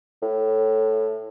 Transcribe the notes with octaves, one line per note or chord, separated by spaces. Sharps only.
A2